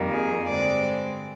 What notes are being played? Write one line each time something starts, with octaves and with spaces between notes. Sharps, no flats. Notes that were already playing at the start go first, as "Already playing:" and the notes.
Already playing: F2 D#3 G3 A#3
G#4
G2 D3 G#3 C4 D5